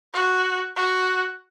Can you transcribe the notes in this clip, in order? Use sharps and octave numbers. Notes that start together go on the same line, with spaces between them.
F#4
F#4